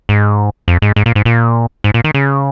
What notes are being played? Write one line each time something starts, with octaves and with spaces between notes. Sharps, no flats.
G#2
F2
G#2
G#2
A#2
G#2
A#2
G#2
A#2
D#3
C#3